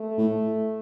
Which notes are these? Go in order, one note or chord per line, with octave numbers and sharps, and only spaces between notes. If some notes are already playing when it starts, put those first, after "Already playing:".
Already playing: A3
A2